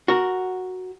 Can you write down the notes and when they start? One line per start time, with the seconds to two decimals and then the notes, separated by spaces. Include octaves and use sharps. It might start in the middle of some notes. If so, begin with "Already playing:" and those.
0.08 F#4 A#4